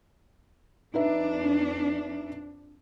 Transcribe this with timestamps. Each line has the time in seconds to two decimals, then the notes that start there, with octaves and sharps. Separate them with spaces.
0.94 F2 D4 D#4 B4 E5